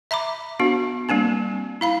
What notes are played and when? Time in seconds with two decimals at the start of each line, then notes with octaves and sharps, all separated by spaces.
0.11 E5 A#5 B5 D6
0.60 B3 D4 F#4
1.09 G3 A#3 C4 D4
1.81 E4 F5 B5